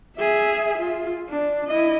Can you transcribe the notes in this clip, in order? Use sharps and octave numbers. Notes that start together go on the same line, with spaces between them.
G#4 E5
F4
D4
E4 D#5